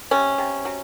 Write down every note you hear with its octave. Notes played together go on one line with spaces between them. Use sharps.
C3 C#4
C3
F#3